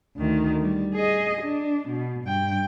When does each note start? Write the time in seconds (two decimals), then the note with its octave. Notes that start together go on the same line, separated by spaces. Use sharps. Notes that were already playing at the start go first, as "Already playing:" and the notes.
0.16 D2 D#3
0.62 G3
0.94 G#4 D#5
1.42 D4
1.89 B2
2.25 G2 G5